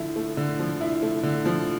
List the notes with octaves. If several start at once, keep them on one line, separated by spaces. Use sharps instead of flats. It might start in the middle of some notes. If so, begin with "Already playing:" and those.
Already playing: D3 F3 A3 E4
A3
D3
F3
E4
A3
D3
F3